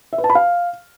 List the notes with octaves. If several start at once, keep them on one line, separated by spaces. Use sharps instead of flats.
E5
B4
A5
B5
F5